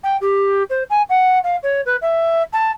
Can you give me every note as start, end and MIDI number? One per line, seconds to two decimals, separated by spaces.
0.04 0.17 79
0.21 0.63 67
0.70 0.83 72
0.90 1.02 80
1.09 1.39 78
1.44 1.56 77
1.63 1.81 73
1.86 1.96 71
2.02 2.43 76
2.53 2.71 81